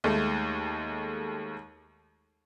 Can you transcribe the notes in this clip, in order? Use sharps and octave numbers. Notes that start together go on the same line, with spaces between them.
D#2 G#3 A3